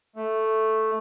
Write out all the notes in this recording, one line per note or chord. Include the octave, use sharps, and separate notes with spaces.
A3